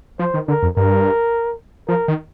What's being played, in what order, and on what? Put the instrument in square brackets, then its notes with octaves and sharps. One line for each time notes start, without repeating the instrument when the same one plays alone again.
[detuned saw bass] F3 [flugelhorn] C5
[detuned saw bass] D#3
[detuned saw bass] D3 [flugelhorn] A#4
[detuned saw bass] F2
[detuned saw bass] G2 [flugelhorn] A#4
[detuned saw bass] F3 [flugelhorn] A#4
[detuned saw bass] D#3